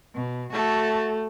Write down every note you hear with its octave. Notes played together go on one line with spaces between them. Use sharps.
B2
A3 F#4 A4